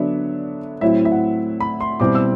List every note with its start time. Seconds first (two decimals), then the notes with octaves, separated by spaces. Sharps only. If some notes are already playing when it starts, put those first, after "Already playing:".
Already playing: D3 F#3 B3 D4 D5 E5
0.81 A2 F#3 C4 E4 E5
1.05 E5
1.12 F#5
1.60 B5
1.81 C6
2.00 B2 G3 C4 E4 D6
2.15 E6